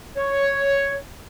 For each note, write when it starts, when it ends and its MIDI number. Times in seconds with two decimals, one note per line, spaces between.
0.17 0.96 73